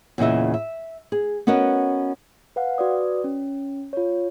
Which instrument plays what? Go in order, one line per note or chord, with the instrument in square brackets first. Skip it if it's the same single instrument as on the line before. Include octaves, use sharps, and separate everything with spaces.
[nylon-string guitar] E2 A#2 C#3 D#5 E5
E5
G#4
B3 C#4 F#4 A#4 D#5
[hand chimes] B4 F5 F#5
F#4 B4 D5 D#6
C#4
F4 C#5